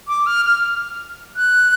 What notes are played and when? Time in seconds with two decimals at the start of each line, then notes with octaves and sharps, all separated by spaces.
0.08 D6
0.26 F6
0.45 F6
1.36 F#6